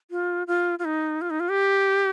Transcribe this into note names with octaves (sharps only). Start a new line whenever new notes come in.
F4
F4
F4
D#4
F4
D#4
F4
G4